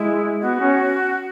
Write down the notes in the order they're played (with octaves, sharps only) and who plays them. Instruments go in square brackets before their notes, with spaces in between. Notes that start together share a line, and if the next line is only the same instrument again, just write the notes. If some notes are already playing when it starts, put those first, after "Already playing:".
Already playing: [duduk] G#3 [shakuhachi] E4
[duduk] B3 [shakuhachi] F#4
[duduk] C#4